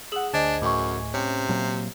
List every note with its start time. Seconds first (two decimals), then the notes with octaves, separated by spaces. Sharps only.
0.12 G#4 F#5 D#6 E6 F#7
0.34 D2 D4 C5 D#5 G#5 G#6
0.62 F#2 A2 C#6 D6
1.14 C3 C#4
1.49 A#2 F#3 A#3